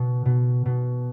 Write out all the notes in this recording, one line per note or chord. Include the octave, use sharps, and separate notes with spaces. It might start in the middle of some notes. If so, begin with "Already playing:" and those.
Already playing: B2
B2
B2